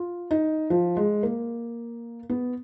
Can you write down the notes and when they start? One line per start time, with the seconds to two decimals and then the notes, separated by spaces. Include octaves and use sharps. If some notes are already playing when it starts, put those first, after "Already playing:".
Already playing: F4
0.31 D#4
0.70 F3
0.97 G#3
1.23 A#3
2.30 B3